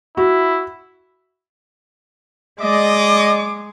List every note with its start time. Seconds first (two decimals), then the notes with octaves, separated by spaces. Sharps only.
0.17 E4 F#4
2.61 G#3 D5 D#5 D6